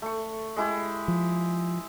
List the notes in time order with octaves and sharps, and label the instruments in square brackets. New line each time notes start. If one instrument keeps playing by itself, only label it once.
[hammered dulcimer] A3 C#6
G#3 E4 G4
[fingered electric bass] F3